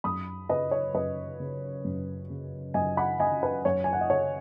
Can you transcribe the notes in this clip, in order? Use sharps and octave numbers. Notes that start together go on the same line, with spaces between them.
F#2 B5 D#6
C#3 B4 D#5
C#5
F#2 B4 D#5
C#3
F#2
C#3
F#2 D#5 G#5
F#5 B5
C#3 D#5 G#5
B4
F#2 C#5
G#5
F#5
D#5
C#3 C#5